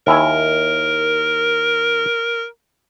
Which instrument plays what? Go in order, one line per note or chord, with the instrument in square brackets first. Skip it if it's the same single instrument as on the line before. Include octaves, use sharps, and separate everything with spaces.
[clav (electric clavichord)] D#2 E4 G#5 [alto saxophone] A#4